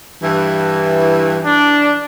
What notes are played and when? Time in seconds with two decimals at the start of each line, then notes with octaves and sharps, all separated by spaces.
0.22 G2 E3
1.45 D4